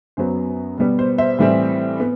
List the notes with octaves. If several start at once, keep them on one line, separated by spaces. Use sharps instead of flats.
F#2 F#3 B3 C5
B2 G3 B3
C5
C5 E5
A2 E3 G3 C4
B3